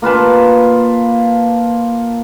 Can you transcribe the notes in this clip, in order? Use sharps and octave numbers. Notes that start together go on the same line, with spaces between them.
A#3 F4 B4 A5